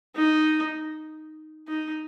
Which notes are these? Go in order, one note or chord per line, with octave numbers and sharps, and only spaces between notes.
D#4
D#4